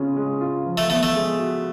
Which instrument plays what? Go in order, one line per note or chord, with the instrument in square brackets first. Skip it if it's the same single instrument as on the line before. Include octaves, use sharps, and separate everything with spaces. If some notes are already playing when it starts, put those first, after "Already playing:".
Already playing: [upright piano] C#3 G#3 C#4 F4
G#3
F4
F3
[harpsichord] A3
[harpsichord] A3 [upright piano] B3
[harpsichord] A3
[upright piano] G#3
F#4